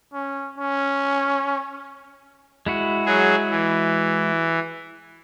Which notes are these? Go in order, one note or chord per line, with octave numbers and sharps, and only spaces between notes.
C#4
C#4
G#3 E4 F#4
F#3 G#4
E3